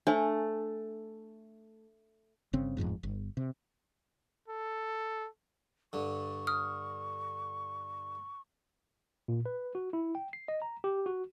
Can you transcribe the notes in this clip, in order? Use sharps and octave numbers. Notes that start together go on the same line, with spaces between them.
A3 D4 C5 G#5
G1 C#3 C4
D1 A1 F2 G#2
G1
C3
A4
G2 D3 C#6
D#6 F6
A#2
B4
F#4
E4
G5
C7
D#5
A#5
G4
F#4